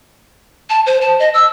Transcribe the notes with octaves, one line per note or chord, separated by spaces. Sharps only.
A5
C5
A5
D#5
E6